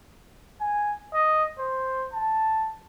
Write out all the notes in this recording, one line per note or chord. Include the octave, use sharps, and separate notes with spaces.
G#5
D#5
C5
A5